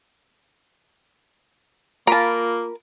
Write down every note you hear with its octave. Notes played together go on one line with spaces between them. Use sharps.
A#3 F4 A#4 A5 B5